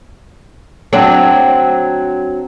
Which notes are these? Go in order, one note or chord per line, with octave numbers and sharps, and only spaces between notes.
F#3 C4 D4